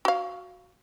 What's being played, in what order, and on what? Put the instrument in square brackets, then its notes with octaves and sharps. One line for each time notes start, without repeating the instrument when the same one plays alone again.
[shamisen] F#4 F5